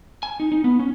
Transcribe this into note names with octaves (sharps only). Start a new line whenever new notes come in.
G#5
D#4
D#4
B3
C#4